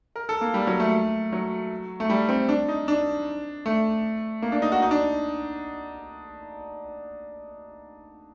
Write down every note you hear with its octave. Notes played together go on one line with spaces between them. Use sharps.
A#4
A4
A#3
G3
F#3
A3
F#3
A3
G3
C4
D4
D#4
D4
A3
A#3
D4
D#4
F#4
D#4
D4